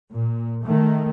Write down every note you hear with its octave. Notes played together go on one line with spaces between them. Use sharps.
A#2
D#3 A3